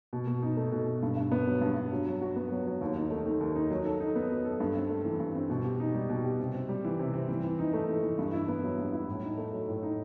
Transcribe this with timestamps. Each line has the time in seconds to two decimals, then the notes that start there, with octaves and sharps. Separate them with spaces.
0.13 B2
0.27 B2
0.42 D#4
0.57 A3
0.72 B2
0.87 B2
1.03 G2
1.17 G2
1.32 B3
1.47 F#3
1.61 G2
1.77 G2
1.92 F#3
2.06 F#3
2.21 F#4
2.36 B3
2.51 F#3
2.66 F#3
2.81 D#2
2.96 D#4
3.11 A3
3.26 D#3
3.41 D#2
3.55 D#4
3.70 F#3
3.85 A4
4.00 D#4
4.16 B3
4.30 F#3
4.45 A4
4.60 G2
4.75 C4
4.89 A3
5.05 E3
5.20 G2
5.35 C4
5.50 B2
5.65 G4
5.80 D#4
5.94 G3
6.09 B2
6.24 G4
6.39 C3
6.54 C4
6.69 G3
6.85 E3
6.99 C3
7.14 C4
7.29 E3
7.44 E3
7.59 D#4
7.73 A3
7.89 E3
8.03 E3
8.18 G2
8.33 E4
8.48 B3
8.64 F#3
8.78 G2
8.93 E4
9.08 A2
9.23 D#4
9.38 A3
9.53 F#3
9.68 A2
9.83 D#4